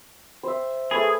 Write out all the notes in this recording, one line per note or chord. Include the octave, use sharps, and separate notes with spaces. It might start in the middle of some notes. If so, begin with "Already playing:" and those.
C5 E5
A3 G#4 B4